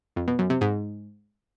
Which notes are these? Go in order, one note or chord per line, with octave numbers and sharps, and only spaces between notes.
F2
B2
F#2
C3
G#2